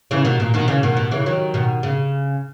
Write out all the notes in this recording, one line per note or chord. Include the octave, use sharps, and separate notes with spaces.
C#3 E3
B2 D#3
A#2
B2 D#3
C#3 E3
B2 D#3
B2
C#3 E3
D#3 F#3
B2 D#3
C#3